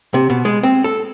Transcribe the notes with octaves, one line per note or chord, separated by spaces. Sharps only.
C3
B2
G#3
C4
A4